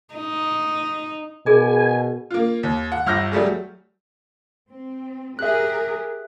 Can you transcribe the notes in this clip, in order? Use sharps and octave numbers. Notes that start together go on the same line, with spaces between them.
D#4
B2 G#4 A#4 D#5 G#5
A#3 F4
D#2
F#5
G1 E6 F6 G6 A#6
F#3 G3 A3 G#4
C4
G4 G#4 A#4 E5 F#6